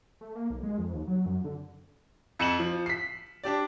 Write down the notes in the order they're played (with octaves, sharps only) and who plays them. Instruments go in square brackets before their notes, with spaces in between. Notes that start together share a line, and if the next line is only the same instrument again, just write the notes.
[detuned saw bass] A3
A#3
B1
G#3
F2
D#2
F#3
F#2
D3
[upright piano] F2 C#7 E7 F#7
F3
B6 C7
D4 G4 D5